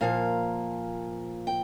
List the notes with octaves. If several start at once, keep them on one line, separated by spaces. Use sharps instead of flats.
A#2 F3 A#3 F5
G5